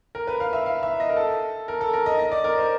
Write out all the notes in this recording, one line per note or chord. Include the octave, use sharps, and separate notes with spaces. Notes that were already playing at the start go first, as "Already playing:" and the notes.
A#4
B4
F5
E5
F5
E5
D#5
A#4
A4
A#4
A4
A#4
D#5
D#5
D5
A#4
C5